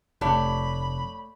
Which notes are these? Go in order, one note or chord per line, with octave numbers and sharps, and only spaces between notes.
F1 A3 C#5 D5 B5